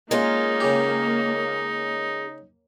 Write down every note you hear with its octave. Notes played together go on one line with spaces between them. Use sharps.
G#3 A#3 C#4 D#4 F4
C#3 G4